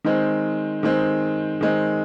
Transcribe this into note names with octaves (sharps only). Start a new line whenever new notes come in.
D#3 G#3 C4
D#3 G#3 C4
D#3 G#3 C4